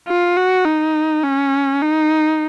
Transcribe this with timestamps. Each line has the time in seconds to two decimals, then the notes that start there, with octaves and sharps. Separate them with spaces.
0.08 F4
0.36 F#4
0.65 D#4
1.24 C#4
1.82 D#4